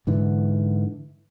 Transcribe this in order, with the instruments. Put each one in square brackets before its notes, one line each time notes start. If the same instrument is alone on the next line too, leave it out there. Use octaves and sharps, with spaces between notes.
[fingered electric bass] G#2 D3 E3